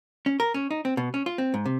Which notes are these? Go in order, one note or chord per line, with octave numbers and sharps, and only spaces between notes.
C#4
A#4
C#4
D#4
C4
B2
C#4
F4
C4
G#2
C3